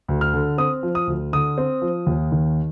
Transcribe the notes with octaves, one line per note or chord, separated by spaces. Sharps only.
D2
F6
D3
C4 D#6
F3
D#6
D2
D3 D#6
C4
F3
D#2
D#3